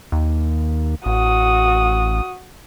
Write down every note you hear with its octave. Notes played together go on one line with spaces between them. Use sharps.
D#2
A1 F#4 D#6